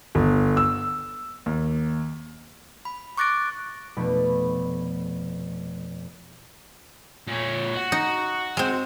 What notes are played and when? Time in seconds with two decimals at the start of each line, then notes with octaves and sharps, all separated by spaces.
0.15 G1
0.57 E6
1.46 D#2
2.85 B5
3.17 C#6 D6 F#6 A6 A#6 D7
3.97 F1 B2 A3 D5 B5
7.27 A#2 C#5
7.74 F#4
7.92 D#4
8.57 G#3 C4